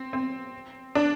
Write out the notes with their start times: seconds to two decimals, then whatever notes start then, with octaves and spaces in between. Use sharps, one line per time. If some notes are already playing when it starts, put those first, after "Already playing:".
Already playing: C4
0.13 C4
0.95 D4